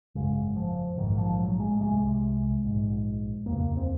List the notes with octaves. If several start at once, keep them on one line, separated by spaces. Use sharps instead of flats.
G#1 F#2 C#3 G#3
F3
A#1 G#2 D#3
F3
F#3
G#3
C2 C3 G#3
A#1 G#2
F1 D#2 C#3 A#3
C4